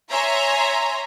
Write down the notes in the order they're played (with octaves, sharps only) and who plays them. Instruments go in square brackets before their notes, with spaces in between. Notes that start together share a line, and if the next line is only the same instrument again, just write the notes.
[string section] C#5 E5 G#5 A#5 C6